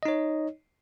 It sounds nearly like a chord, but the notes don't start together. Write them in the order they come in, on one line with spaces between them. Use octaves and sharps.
D#5 D#4 C#5